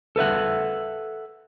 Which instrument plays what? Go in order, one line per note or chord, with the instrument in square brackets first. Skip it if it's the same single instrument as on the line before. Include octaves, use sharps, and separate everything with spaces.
[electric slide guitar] A4 B4 E5 F#5